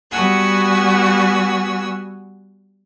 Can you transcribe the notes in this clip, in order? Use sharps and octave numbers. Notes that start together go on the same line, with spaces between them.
G3 B3 F#4 F#5 G#5 E6